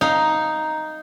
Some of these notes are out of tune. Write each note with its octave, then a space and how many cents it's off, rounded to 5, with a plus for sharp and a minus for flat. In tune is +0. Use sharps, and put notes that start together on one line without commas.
D#4 +0 F5 +0